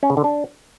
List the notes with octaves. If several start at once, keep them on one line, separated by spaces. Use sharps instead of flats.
C#4
C#3
D3
D4